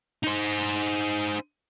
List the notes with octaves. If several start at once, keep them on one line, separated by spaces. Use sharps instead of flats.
D#4 C5